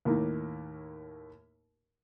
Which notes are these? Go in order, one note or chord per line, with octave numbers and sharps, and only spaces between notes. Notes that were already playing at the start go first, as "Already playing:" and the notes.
D#2 A2 A#3